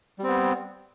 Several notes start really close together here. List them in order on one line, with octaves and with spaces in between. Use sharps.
G3 C4 B3